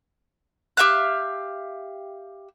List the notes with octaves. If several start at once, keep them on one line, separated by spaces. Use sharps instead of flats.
G4 E5 F5 F#6